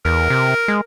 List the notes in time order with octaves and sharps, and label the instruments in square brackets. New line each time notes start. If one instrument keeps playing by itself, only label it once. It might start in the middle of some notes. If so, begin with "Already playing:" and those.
[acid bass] E2 [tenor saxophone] A#4
[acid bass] C3
G#3